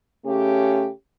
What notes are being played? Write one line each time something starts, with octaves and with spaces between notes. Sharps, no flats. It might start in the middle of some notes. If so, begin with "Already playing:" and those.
C#3 A3 C#4 G4